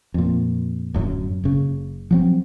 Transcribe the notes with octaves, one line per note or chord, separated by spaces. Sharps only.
F2 A#2
D1 F#2 F#3
F#1 C#3
F3 F#3 C4